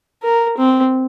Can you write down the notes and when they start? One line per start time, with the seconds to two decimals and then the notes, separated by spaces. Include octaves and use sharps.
0.22 A#4
0.57 C4